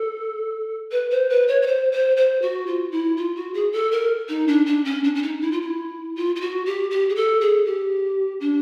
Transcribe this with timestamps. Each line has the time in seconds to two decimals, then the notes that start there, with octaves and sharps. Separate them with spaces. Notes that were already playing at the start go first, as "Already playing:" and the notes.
Already playing: A4
0.92 B4
1.10 C5
1.30 B4
1.48 C#5
1.62 C#5
1.67 C5
1.92 C5
2.17 C5
2.42 F#4
2.67 F4
2.91 E4
3.17 F4
3.35 F#4
3.54 G#4
3.72 A4
3.91 A#4
4.29 D#4
4.47 D4
4.66 D4
4.85 C#4
5.04 D4
5.15 D4
5.23 D#4
5.41 E4
5.51 F4
5.61 E4
6.16 F4
6.36 F4
6.41 F#4
6.66 G4
6.91 G4
7.09 G#4
7.15 A4
7.41 G#4
7.66 G4
8.40 D4